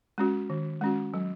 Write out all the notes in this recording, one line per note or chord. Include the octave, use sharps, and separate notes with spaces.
G#3 C#4 F#4
D#3
G#3 C#4 F#4
F#3